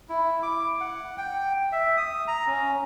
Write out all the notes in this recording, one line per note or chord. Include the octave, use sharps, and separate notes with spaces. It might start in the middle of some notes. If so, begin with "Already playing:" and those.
E4
D6
F#5
G5
E5
D#6
A#5
C#4